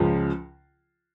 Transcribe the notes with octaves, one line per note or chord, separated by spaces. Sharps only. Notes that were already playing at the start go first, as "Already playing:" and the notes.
Already playing: C#2 C#3 F3